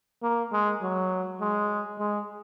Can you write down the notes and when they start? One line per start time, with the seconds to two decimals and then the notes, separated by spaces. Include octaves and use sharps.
0.23 A#3
0.53 G#3
0.82 F#3
1.41 G#3
1.99 G#3